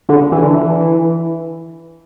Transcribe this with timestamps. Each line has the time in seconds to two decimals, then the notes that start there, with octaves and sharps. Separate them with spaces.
0.09 D3
0.32 E3
0.43 D3
0.55 E3